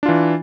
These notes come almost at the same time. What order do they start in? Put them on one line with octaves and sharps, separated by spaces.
D4 F4 E3